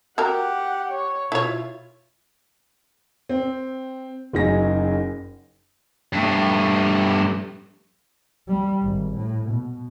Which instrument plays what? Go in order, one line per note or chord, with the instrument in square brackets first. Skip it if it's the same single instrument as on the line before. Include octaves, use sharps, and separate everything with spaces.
[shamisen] F#4 A#4 [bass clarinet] G4 [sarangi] F#5
[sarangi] C#5
[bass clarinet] B2 [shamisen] E4 C#5 [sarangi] F4
[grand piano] C4
F#1 F#2 D#4 G#4 A#6
[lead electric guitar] G2 A3
[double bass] G3
G#1
A2
B2